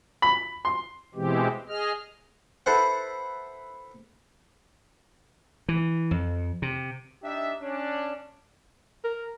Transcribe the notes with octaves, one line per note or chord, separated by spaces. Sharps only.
B5
C6
B2 E3 G#3 C4 G4
G#4 D#5 F6
E4 A4 B4 C5 F#5
E3
F2
C3
D4 D#4 G4 E5
C#4 D4
A#4